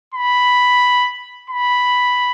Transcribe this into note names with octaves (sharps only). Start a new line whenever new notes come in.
B5
B5